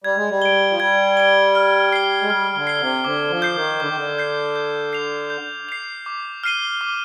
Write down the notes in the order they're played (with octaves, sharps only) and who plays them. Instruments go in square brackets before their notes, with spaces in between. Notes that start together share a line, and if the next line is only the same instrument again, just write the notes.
[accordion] G3 [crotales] G#6
[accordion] G#3
G3
[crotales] D7 G7
[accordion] F3
[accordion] G3 [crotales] G#6
[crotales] D7 G7
F6
C7 G7
[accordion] G#3
[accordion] G3 [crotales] F6
[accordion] D3
[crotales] C7 G7
[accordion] C3
[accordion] D3 [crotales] D6
[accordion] F3
[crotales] G6 C7
[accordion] D#3
[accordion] D3 [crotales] D6
[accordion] D#3
D3
[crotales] G6 C7
G6
C7 F7
G6
C7 F7
D6
F6 C7 D#7 G7
D6